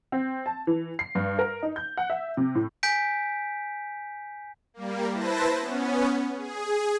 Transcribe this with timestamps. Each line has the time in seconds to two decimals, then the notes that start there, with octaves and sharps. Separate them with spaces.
0.12 C4
0.46 A5
0.67 E3
0.99 C7
1.15 G2
1.39 A#4
1.63 D#4
1.76 G6
1.97 F#5
2.10 E5
2.37 C3
2.55 A2
2.83 G#5 G6 B6 D7
4.74 G3 A#3
5.13 E4 B4 C5 A5 A#6
5.60 B3 C#4
6.36 G#4